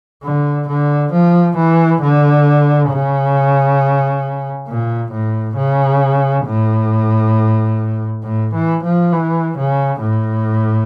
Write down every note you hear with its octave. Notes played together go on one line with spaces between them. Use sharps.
D3
D3
F3
E3
D3
C#3
A#2
A2
C#3
A2
A2
E3
F3
E3
C#3
A2